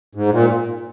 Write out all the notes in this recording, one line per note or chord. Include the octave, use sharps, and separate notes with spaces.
G#2
A#2